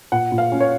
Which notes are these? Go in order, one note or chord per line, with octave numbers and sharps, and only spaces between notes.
A#2 F#5
A#2
F5
C#4
C#5